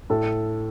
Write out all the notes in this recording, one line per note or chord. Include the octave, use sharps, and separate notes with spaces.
A2 A4